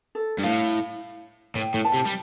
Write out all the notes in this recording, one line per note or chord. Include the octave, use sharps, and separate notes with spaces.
A4
G2
A2 F5
A2 G5
A2
A5
C3
G3